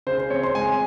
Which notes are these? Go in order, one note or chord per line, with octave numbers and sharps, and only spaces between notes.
C#3 C5
C5
C4 C#5
C6
G#3 G#5